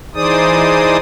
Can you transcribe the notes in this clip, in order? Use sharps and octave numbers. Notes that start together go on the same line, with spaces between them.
E3 D#4 G#4 C5 D5 D#6